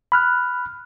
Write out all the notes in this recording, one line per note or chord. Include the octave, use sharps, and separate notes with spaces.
B5 F6 F#6